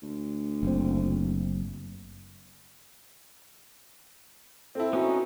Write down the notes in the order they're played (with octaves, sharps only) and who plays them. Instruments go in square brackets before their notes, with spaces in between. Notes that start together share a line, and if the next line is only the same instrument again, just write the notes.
[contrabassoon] D2
[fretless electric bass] F#1 C4
[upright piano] C4 E4 [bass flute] A4
[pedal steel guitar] B3 C#4 D#4 [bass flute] F#4